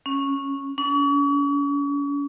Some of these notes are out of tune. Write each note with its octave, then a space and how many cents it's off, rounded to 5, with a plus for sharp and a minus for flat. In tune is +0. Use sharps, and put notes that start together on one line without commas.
C#4 -5
C#4 +40